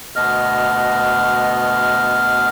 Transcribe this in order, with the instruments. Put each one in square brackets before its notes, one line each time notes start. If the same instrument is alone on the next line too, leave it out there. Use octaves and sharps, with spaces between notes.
[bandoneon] D2 B2 B3 D#5 F6